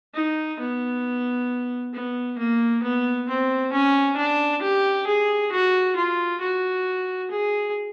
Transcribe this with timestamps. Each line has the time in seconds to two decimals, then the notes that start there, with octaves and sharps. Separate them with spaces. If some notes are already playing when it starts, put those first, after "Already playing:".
0.14 D#4
0.59 B3
1.93 B3
2.38 A#3
2.82 B3
3.28 C4
3.73 C#4
4.17 D4
4.62 G4
5.07 G#4
5.52 F#4
5.96 F4
6.40 F#4
7.31 G#4